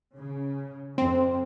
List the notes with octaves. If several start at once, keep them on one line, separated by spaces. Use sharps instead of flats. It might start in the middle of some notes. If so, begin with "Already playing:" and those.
C#3
F2 C4